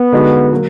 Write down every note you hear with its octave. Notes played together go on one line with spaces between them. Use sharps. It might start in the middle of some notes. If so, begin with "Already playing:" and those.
Already playing: B3
D3 G#3 D#4 F#4
F#3 A#3